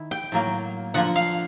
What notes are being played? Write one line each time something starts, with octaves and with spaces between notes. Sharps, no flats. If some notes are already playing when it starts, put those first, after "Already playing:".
Already playing: D#3 E4
G5
A2 F#3 A#3
D3 F3 A#3 F#5
F5